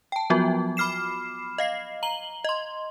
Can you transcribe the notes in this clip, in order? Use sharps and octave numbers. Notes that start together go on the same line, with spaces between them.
G5 A5
F3 F#3 B3 F4 F#4
B5 D6 F6 C7 E7
D#5 F5 C7
A#5 F#7 G7
D#5 C6